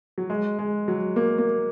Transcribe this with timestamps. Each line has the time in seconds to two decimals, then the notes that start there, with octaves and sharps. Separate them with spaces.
0.18 F#3
0.30 G#3
0.59 G#3
0.88 F#3
1.16 A#3
1.38 A#3